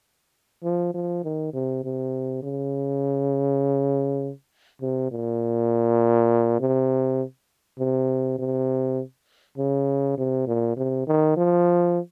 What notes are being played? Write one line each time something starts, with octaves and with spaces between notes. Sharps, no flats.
F3
F3
D#3
C3
C3
C#3
C3
A#2
C3
C3
C3
C#3
C3
A#2
C3
D#3
F3